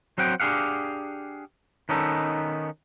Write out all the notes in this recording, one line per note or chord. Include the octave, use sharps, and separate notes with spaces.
F#3 C4 F#5 G5
D4 G4 G#4 F5 F#5
D#3 B3 C#4 D#4 A4